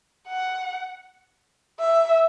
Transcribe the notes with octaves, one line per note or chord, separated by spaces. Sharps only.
F#5
E5